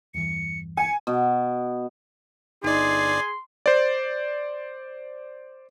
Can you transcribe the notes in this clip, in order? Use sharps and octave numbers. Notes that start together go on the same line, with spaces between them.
E2 G2 E3 C#7
G#5 C#7
B2
G1 D#4 G#4 D5 C6
C5 D5